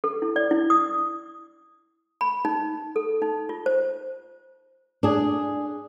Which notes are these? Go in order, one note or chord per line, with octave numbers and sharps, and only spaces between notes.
A4
E4
D5
E4
D#6
B5
D#4
A4
D#4
F4
C5
D4 G#4